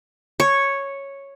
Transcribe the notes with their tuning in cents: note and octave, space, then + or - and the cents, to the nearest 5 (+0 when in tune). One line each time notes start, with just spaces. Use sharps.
C#5 -5